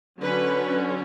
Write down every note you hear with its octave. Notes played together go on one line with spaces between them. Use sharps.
D3 F#3 C#4 B4